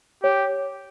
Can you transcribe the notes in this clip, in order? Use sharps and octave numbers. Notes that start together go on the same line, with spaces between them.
G4 C#5